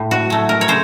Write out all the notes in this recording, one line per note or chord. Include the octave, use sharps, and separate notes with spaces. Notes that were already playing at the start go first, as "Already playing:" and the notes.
Already playing: A2
F#4
F#3 A3
A#4
C#5
C#3 C5